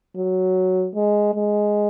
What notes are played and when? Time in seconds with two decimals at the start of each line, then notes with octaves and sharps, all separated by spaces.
0.16 F#3
0.95 G#3
1.35 G#3